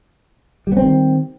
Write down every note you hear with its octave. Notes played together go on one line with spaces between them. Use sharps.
D#3 G3 B3 C4